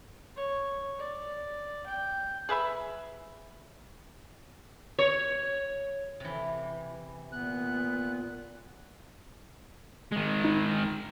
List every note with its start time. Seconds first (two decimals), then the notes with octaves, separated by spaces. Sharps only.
0.36 C#5
0.99 D5
1.86 G5
2.49 G#4 B4 E5 B5
4.99 C#5
6.20 C3 E3
7.32 A#2 B3 F#6
10.12 D#3 G#3
10.44 D#4